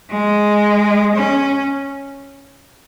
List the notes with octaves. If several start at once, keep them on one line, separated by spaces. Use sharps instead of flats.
G#3
C#4